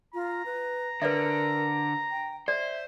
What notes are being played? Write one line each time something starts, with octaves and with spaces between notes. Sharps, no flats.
F4 A#5
B4
D3 A#4 B4 D5 E5
G5
C5 D5 E5